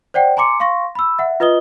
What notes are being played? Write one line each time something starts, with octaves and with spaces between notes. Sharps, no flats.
C5 D5 F#5 G5
G#5 A#5 C6 D6 C#7
F5 C6 C#6 A#6
B5 E6
E5 F#5
F4 B4 D#5 D#6 G7